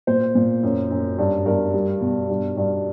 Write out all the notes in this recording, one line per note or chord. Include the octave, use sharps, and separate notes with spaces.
A#2 C5
A#2
F#2
F#2
G2
G2 A#4
G3
B2
G2
G2